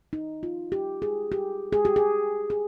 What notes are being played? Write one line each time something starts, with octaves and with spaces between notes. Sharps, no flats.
D#4
F4
G4
G#4
G4
G#4
G4
G#4
G#4